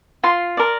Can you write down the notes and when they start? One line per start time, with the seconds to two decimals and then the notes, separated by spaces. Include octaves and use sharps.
0.23 F4 C6
0.57 A#4 D5